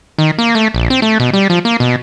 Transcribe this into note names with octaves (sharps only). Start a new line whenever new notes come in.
D#3
A#3
A3
A#1
C4
A3
B2
G3
F3
A#3
B2